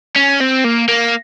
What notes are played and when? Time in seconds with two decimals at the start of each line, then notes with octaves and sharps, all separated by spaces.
0.16 C#4
0.41 C4
0.65 A#3
0.88 A#3